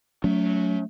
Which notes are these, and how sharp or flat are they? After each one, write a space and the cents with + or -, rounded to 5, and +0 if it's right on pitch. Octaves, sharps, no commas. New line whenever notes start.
F#3 -10 A3 +0 C#4 +40